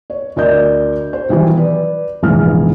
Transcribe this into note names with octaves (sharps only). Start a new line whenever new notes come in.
C#5
D2 D4 A#4 D5 D#5 G6
C5
B2 D#3 E3 F#3 G3
B4 D5
F1 A#1 G#2 E3 B3 F6